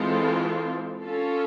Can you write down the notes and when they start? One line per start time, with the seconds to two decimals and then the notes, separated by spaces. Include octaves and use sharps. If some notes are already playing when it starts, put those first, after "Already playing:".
Already playing: E3 G#3 C4 F4 A4
1.02 C#4 F4 A4